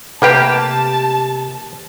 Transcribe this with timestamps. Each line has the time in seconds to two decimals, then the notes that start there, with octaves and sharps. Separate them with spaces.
0.22 C3 A3 A#3 G4 B4 G5 A5